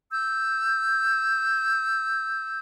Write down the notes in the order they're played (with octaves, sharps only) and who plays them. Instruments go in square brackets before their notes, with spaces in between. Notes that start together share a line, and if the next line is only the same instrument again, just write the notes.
[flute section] E6 G6